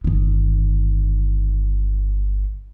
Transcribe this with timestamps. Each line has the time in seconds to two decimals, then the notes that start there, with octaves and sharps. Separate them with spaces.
0.04 G1 D#3